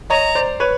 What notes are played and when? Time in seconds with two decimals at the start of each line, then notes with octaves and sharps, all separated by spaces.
0.10 C#5 D#5 A#5
0.35 C5 D5
0.60 B4 C#5